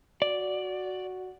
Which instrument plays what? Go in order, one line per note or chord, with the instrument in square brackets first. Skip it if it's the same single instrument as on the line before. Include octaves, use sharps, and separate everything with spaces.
[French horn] F#4 [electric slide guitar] D5